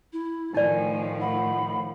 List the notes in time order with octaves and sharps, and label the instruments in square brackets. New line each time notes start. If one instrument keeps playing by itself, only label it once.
[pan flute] E4
[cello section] A2 D#3 F3 [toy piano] D#4 D5 [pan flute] G#5
[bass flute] F#5 [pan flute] B5